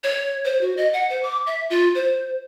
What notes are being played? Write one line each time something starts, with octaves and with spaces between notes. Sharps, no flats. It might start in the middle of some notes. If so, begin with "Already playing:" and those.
C#5
C5
F#4
D#5
F#5
C5
D6
E5
F4
C5